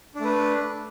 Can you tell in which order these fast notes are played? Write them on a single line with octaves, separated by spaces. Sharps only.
D4 A3 B4